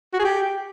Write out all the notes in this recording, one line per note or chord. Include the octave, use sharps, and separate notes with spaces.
F#4
G#4
G4